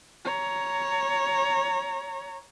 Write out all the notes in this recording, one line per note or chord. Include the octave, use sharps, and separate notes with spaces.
C#5 A#5